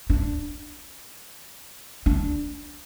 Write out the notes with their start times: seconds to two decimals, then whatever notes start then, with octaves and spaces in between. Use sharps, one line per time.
0.10 D4
2.06 D4